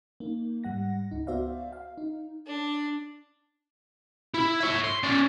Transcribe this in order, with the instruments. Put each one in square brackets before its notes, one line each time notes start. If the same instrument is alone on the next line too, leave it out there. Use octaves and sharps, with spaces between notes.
[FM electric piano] A#3 D#4
G#2 G3 F#5 A#6
C#2 D#4
B3 F#4 C5 D5 E5 F5
F5
D#4
[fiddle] D4
[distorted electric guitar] E4
C#5 E5
C6
C#4 D5